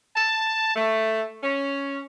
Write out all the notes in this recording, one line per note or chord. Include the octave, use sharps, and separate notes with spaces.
A5
A3
C#4